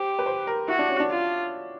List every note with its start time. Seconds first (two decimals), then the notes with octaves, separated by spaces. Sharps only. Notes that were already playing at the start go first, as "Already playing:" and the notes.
Already playing: G4 C5
0.19 B4
0.26 C5
0.47 A#4
0.68 E4 F#4
0.79 D4
0.89 C#4
1.00 D4
1.10 F4